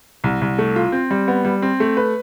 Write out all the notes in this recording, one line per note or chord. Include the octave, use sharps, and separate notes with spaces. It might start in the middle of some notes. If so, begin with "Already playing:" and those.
C2
C2
A3
F4
C4
G3
B3
G3
C4
A3
B4